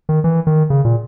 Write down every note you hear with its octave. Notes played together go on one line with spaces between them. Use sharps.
D#3
E3
D#3
C#3
A#2